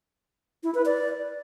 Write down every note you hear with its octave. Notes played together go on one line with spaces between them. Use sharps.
E4
B4
D5